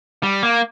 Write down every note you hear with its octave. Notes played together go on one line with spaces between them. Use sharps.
G3
A#3